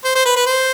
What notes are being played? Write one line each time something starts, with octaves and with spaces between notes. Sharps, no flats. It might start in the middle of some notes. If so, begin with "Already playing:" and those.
C5
C5
B4
B4
C5